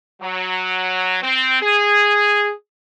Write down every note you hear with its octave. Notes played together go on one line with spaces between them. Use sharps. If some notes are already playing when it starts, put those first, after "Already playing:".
F#3
C4
G#4